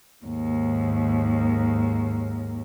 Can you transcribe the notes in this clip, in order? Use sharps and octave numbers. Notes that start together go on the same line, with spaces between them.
D#2 G#2